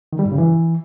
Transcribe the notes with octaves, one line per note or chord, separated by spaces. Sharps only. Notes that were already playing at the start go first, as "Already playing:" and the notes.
D#3
G3
G2
C#3
E3